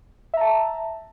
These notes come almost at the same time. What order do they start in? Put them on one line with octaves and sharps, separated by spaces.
E5 A#5 A5